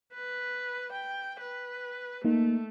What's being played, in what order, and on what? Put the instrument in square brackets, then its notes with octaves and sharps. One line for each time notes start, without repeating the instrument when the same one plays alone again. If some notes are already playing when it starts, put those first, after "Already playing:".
[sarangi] B4
G5
B4
[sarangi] A3 [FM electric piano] A#3 D#4